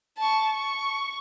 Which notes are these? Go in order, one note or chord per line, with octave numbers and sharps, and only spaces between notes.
A5 C#6
C#6